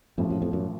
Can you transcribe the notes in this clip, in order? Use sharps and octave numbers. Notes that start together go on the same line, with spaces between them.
A1 F2 A2 F3
F#2
F2
F#2